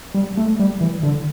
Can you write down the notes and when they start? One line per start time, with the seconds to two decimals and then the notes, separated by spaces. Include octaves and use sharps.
0.14 G3
0.37 A3
0.60 G3
0.81 E3
1.03 D3